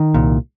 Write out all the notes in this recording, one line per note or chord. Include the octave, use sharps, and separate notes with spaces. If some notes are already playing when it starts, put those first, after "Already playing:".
Already playing: D#3
C2 A#2